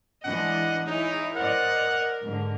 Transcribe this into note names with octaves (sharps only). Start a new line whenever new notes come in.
E3 G#3 D4 D#5 F#5
D#4 E4 G#4 C#5
A#4 C5 D5 D#5 F#5
G#2 D3